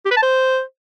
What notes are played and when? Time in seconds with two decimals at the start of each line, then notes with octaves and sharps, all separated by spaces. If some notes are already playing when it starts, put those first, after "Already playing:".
0.06 G4
0.11 B4
0.17 A5
0.23 C5